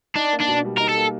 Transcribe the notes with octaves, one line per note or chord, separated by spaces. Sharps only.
D4 D#4
A#3
D4
B2
G3
D#4 A#4
A4
A#3